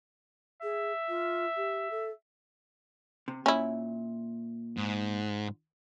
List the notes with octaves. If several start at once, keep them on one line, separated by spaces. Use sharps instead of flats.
G#4 E5
F4
G4
A4
C3
A#2 C#4 E4 E5
G#2